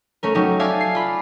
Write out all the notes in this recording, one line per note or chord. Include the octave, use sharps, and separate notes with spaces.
A3 C#4 A#4
F#3 A3 C#4 D#4 G4
D5 E5 F5 G#5 A5
C7
F4 B5